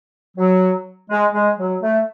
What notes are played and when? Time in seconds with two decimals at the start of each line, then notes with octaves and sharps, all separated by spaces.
0.37 F#3
1.10 G#3
1.34 G#3
1.58 F#3
1.82 A3